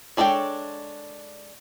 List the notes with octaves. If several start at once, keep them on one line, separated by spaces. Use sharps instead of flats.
G#3 D4 A4 C#5 G5